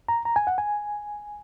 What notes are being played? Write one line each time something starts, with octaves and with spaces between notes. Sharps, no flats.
A#5
A#5
G#5
F#5
G#5